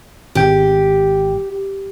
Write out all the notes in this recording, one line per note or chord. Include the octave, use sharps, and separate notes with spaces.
G#1 G4 G5